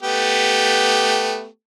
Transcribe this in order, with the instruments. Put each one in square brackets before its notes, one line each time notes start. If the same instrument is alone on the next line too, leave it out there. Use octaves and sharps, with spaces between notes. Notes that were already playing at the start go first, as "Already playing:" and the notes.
[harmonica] A3 B3 G4